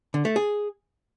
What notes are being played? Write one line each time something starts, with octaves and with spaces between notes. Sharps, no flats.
D3
A3
G#4